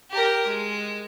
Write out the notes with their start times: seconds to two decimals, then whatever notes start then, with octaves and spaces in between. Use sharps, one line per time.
0.11 G4 A#4
0.47 G#3